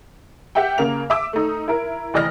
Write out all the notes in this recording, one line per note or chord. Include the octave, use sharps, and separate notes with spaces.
G4 E5 F#5 G5
C#3 A#3 F7
E5 D6 E6
A3 D#4
E4 A#4
F1 E3 D5 D#5 F6 A#6